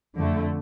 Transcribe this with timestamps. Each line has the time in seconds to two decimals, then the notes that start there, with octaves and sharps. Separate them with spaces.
0.15 F2 D3 A3